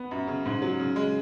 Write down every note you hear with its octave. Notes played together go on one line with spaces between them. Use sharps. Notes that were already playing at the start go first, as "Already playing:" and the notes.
Already playing: B3
F#2
C#3
G#2
F#3
C#3
G#3